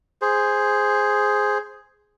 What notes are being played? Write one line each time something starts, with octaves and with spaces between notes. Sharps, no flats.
G#4 C5